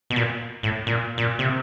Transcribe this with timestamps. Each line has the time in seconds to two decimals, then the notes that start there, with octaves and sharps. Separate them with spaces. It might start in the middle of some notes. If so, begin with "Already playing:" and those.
0.10 B2
0.16 A#2
0.63 A2
0.87 A#2
1.18 A#2
1.39 C3